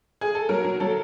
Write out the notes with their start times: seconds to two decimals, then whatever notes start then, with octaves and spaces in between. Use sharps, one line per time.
0.21 G#4
0.35 A4
0.49 F#3 A#4
0.64 F#3
0.80 F#3 A4